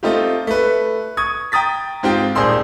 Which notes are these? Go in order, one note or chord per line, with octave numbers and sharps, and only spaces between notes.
A3 C4 D#4 F4 G4
A3 B4
C#6 D#6 G#6
G5 A#5 D#6 A6 B6
G#2 C4 F4 G4 G5
D#1 G#4 C5 C6 E6